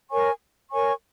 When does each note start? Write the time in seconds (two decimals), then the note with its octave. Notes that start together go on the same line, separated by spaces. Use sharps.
0.09 A#4 C#5 G#5 C#6
0.70 A#4 C#5 G#5 C#6